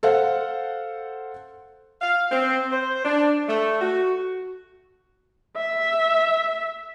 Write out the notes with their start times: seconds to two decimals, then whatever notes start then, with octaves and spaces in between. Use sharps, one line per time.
0.03 A4 C5 F5 F#5
2.01 F5
2.31 C4
2.72 C5
3.04 D4
3.48 A3
3.81 F#4
5.57 E5